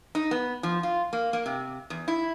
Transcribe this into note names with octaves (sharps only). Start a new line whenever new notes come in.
D#4
B3
F3
F4
A#3
A#3
C3
E2
E4